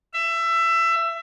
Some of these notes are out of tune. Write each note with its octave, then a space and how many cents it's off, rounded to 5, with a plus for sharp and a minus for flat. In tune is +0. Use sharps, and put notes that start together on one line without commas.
E5 +20